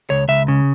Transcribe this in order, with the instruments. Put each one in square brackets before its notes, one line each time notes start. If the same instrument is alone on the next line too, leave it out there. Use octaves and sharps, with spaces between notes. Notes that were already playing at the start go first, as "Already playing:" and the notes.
[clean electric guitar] C#2 C#5
C#2 E5
C#3